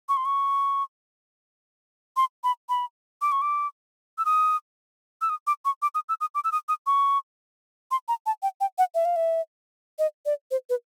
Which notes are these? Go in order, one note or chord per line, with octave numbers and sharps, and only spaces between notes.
C#6
C6
C#6
C6
B5
B5
D6
C#6
D6
E6
D#6
E6
D#6
D6
C#6
D6
D#6
E6
D#6
D6
E6
D#6
D#6
C#6
C6
A#5
A5
G5
G5
F#5
E5
F5
E5
D#5
D5
C5
B4